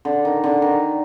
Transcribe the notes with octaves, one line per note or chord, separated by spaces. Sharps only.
D3
D#3
D3
D#3